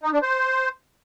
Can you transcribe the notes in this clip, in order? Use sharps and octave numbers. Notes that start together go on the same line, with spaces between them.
D#4
D4
C5